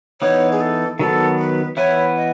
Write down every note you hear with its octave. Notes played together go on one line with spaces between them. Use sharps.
E3 B3 D#4 C#5
G#4
A4
D#3 F#3 B3 A4
B4
E3 B3 E4 B4 C#5
D#5